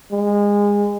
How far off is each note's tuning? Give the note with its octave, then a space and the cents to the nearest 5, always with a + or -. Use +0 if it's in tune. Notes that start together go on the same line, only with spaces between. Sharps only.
G#3 -25